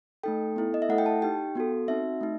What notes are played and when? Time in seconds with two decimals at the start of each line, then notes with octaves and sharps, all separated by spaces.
0.23 A3 D#4 A4 G5
0.56 B3 E4 A4
0.74 D#5
0.82 E5
0.89 A3 E4 A4 F#5
0.98 G5
1.06 A5
1.22 D#4 G4 G5
1.55 B3 F#4 A4
1.88 C4 D#4 F#4 E5
2.21 A3 D#4